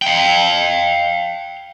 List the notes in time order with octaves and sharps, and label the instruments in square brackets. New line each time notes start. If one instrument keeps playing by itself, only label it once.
[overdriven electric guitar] F5 G5